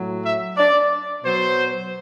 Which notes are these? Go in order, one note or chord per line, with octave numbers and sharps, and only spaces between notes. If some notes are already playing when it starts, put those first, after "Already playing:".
Already playing: A2 F#3
E5
D5
B2 F#3 C5